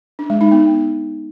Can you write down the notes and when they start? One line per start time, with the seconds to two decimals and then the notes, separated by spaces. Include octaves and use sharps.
0.19 D4
0.30 G#3
0.41 D#4
0.52 B3